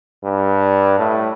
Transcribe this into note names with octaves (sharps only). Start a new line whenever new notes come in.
G2
A2